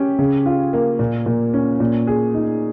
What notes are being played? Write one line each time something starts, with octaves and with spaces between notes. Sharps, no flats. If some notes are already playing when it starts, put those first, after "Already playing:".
Already playing: C#4 G4
C#3
F4
A#3
A#2
A#2
C#4
A#2
G#4
D#4